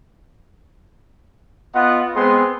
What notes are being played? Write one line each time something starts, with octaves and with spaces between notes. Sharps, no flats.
B3 F4 D#5 F#5
G#3 B3 C4 G#4 C6